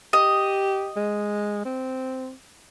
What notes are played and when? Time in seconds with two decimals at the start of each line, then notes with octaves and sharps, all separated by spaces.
0.13 G4 D#5
0.96 G#3
1.65 C4